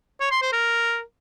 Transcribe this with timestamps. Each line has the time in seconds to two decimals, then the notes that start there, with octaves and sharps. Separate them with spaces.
0.21 C#5
0.31 C6
0.42 C5
0.53 A#4